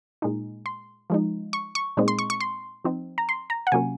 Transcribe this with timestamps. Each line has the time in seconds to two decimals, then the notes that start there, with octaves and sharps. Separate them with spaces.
0.22 A#2 G#3 D#4
0.66 C6
1.10 F3 G#3 D#4
1.53 C#6
1.75 C#6
1.97 A#2 G#3 C4 D#4
2.08 C6
2.19 C#6
2.30 C#6
2.41 C6
2.84 F3 C4 D#4
3.18 A#5
3.29 C6
3.50 A#5
3.67 F#5
3.72 C3 F#3 A#3 C#4 G#5